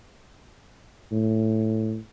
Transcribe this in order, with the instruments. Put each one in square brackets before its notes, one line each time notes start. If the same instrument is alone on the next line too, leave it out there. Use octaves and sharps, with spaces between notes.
[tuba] A2